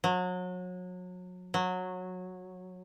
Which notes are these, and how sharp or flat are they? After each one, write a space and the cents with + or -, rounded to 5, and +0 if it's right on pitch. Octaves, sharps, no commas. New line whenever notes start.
F#3 -30
F#3 -15